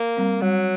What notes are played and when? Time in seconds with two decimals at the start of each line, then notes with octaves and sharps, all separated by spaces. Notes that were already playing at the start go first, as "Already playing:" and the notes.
Already playing: A#3
0.17 G3 C4
0.42 F#3 G3